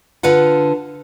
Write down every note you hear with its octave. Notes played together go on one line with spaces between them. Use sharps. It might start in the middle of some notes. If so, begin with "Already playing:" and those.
D3 F4 A4 B4 F5 F#5